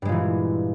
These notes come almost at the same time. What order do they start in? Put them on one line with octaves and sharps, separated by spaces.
G2 G#3 A#2 E3